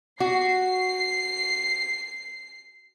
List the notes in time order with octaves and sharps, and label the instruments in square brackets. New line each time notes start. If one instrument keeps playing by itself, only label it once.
[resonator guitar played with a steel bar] F#4 [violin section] C7